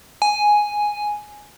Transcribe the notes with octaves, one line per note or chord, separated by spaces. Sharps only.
G#5